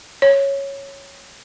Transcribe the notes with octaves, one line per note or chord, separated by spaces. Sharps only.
C#5